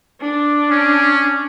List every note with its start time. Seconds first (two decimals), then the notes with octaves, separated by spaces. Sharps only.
0.21 D4
0.71 C#4